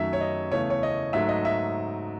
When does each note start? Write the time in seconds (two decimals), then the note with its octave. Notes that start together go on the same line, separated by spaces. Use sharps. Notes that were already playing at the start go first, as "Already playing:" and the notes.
Already playing: F#2 D#3 F#3 A3 E5
0.13 C#5
0.21 D#5
0.52 E2 C#3 E3 A3 C#5
0.70 C#5
0.83 D#5
1.13 G#2 F#3 A3 E5
1.29 D#5
1.45 E5